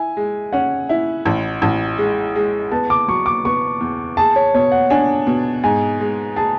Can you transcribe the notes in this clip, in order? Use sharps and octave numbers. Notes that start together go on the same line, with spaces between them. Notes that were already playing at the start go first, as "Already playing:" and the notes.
Already playing: E4 G#5
G#3
C#4 F#5
E4
A1
A1
G#3
G#3
B3 A5
D6
F#3 C#6
D6
B3 C#6
E2
G#4 A5
C#5
B2 C#5
F#5
D4 G#5
B2
G#2 G#5
G#3
G#4 A5